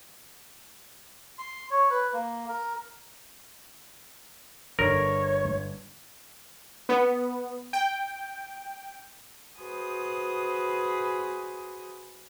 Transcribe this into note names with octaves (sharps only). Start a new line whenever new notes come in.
C6
C#5
B4
A#3
A#4
G1 D3 A#4 C#5
B3
G5
F#4 G#4 B4 C5 D#6